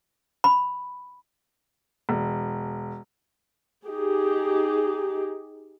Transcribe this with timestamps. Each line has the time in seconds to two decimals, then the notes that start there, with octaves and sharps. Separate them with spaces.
0.44 B5
2.09 E1
3.84 D#4 G4 G#4